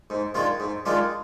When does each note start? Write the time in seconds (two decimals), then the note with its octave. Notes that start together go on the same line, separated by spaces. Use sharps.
0.10 G#2
0.34 D#3 G#3 D4 F4
0.60 G#2
0.85 D#3 G#3 D4 F4